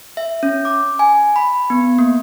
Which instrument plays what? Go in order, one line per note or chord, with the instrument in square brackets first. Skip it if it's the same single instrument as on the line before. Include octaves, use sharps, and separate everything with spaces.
[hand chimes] E5
C#4
D6
G#5
B5
B3
A#3